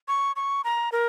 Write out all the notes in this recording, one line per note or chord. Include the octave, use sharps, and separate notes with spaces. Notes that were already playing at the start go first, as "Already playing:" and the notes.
C#6
C#6
A#5
A#4